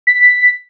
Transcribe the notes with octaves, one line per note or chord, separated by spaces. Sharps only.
B6